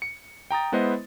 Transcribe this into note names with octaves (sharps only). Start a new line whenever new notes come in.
C#7
G5 A#5 D#6 A6
G#3 B3 E4 B4 C5 D#5